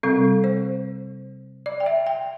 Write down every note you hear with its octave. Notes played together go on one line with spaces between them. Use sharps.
C3 G3 C4 A4
C5
D5
G5
E5
G5